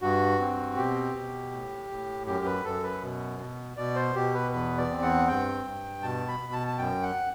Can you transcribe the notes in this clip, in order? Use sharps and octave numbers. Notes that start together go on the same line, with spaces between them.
G2 F#4
C4
B2 G4
B2
A2
A2
F#2 G4
B4
F#2 A4
B4
B2
B2
B2 D5
C5
B2 G4
B4
E2 B4
D5
C4
F#5
G2 G5
G2
B2 A5
B5
B2
A5
A5
F#2 G5
F#5